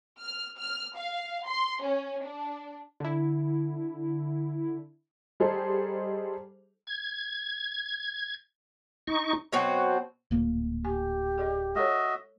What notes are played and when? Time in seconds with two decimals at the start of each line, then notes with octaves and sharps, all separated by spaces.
0.19 F6
0.57 F6
0.96 F5
1.46 C6
1.81 C#4
2.23 D4
3.00 D3 E4
5.40 G3 D#4 G#4 A4 C5
6.87 G#6
9.07 D#4 C#6
9.52 B2 F#3 C4 F#4
10.31 D1 A#2 A#3
10.85 G4 G#5
11.38 G#4 D5 D#5
11.75 G#3 F#4 A4 C#5 D#5 E5